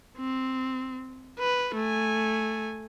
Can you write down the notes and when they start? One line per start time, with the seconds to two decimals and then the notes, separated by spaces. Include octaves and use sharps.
0.18 C4
1.39 B4
1.75 A3 G#5